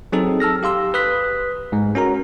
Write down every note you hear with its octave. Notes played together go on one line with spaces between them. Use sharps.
F#3 C4 D#4 G#4 A4
A5 E6 F6 A#6
G4 F5 C6 E6
B4 D#6 F#6 B6
G#2 G#3
C#4 F#4 A#4 A#5